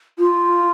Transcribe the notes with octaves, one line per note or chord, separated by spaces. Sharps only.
F4